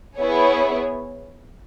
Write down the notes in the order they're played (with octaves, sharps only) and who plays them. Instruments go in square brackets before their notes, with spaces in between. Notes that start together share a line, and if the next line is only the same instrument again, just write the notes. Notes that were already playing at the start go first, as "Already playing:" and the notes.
[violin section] B3 E4 G#4 C#5